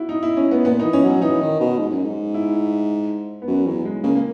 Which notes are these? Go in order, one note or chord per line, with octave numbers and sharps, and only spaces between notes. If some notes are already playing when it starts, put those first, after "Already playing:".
Already playing: E4 F#4
D#4
E4
C#4
B3
A#2 B3
D#4
E3
C#4
F#3 C#4
E3 D#4
D#3
B2
G#2
F#2
G#2
E4
B3
F#2 C#4
E2 F#3
G#3
C#3 A#3
A#3